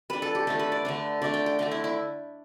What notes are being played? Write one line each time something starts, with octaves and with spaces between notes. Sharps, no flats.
G3 D4 B4
A4
G4
D3 A3 D4 A4
B4
D5
D3 A3 D4
D3 A3 D4 D5
G5
G5
D3 A3 D4 G5
E4
E4